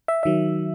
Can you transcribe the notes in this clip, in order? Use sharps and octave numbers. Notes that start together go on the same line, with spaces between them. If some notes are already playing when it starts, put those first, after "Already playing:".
E5
D#3 F#3 E5